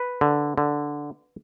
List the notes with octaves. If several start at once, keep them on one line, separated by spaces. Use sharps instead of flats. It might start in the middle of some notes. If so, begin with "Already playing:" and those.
Already playing: B4
D3
D3